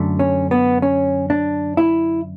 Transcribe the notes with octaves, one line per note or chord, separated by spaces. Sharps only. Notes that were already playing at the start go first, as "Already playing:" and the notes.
Already playing: F#2 D3 A3
C#4
B3
C#4
D4
E4